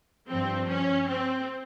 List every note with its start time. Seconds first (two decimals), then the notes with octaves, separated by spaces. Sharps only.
0.28 G2 F3 C4
0.68 C#4
1.08 C4